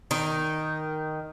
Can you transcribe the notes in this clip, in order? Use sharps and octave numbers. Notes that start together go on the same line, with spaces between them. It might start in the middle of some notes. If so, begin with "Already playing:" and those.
D#3 D#4